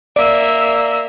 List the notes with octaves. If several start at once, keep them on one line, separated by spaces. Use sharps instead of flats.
A#3 D5 E5 E6